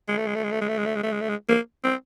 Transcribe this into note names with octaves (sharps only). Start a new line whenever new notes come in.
G#3
A3
G#3
A3
G#3
A3
G#3
A3
G#3
A3
G#3
A3
G#3
A3
G#3
A#3
C4